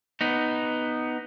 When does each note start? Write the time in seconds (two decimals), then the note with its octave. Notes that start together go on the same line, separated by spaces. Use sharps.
0.21 B3 D#4